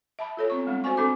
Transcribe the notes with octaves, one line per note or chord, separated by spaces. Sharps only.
E5 A5 B5
F4 A4 C#5
B3 C4 C#6
G3 G#3 C4 D4
F#4 C5 D5 G#5 C#6
C4 D4 A4 G#5 D6